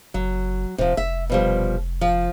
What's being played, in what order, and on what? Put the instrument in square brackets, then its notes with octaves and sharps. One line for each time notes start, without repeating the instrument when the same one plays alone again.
[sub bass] F#1 [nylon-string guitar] F#3
[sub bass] D#1 [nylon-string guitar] C3 F3
[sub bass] F1 [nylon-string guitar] E5
[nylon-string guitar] B2 F3 G3
F3